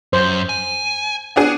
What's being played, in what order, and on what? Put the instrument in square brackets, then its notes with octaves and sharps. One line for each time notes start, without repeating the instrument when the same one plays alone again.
[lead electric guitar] F#2 [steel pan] C5
[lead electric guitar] G#5
[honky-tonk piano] B3 D4 G#4